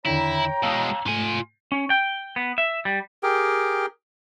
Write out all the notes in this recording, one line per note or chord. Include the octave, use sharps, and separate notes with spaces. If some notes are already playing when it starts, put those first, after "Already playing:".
E2 D3 D#3 E4 C#5 G5 A#5
B2 G#3 F5 A5 E6
G#2 A3 F4 G#5
C#4
G5
B3
E5
G3
G4 G#4 A#4 G5